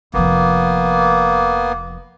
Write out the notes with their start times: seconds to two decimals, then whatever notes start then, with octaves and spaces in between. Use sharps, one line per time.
0.14 F1 F3 A#3 B3